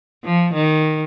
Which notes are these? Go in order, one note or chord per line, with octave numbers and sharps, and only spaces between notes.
F3
D#3